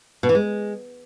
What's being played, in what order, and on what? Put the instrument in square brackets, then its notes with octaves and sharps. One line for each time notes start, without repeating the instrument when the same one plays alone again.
[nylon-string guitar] B2
E3
G#3